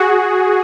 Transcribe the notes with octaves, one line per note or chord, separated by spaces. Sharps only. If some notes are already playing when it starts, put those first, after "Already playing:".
Already playing: F#4 G#4